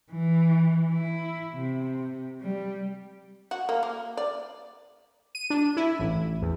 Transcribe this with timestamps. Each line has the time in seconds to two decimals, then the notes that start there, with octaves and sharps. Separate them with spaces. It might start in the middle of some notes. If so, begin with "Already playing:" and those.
0.11 E3
0.91 E4
1.55 C3
2.41 G3
3.51 F#4
3.69 A#3
3.83 A#3
4.17 D5
5.35 D#7
5.50 D4
5.77 E4
5.99 A1
6.42 E2